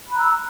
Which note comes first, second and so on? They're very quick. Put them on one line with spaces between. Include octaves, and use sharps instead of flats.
B5 F#6 A#5 E6